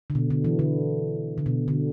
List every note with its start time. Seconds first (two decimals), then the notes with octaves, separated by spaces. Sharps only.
0.10 D3
0.15 B2
0.30 D3
0.44 E3
0.59 D3
1.38 D3
1.46 B2
1.68 D3